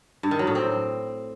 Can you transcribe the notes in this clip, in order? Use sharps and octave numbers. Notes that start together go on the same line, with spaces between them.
G2
D#3
F#3
A2
C4